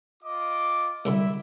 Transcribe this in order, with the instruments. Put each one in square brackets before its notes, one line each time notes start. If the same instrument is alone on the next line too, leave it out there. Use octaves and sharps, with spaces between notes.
[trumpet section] F4 D#5 D6
[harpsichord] C2 F#2 D3 [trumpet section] E4 E5